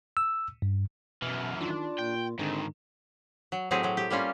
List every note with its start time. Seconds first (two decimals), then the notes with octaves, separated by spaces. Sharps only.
0.17 E6
0.62 G2
1.22 F#2 B2 E3 F6
1.61 D#3 D4 F4
1.99 A#2 G5
2.39 G#2 D3 D#3 C4
3.52 F#3
3.71 A2 F#3 C4 G4 G#4
3.83 F#3 C4
3.97 G4
4.10 G3 A#3 C#4 F4